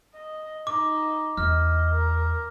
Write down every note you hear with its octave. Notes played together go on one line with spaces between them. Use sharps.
D#5
D#4 D6
E2 D#5 F6
A#4